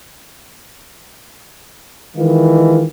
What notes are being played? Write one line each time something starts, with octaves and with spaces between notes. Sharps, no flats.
D#3 E3 G#3 F4